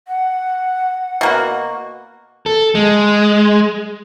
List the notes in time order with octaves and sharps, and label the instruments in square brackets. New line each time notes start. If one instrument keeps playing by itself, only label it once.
[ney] F#5
[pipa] B2 A#3 F#4
[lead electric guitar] A4
G#3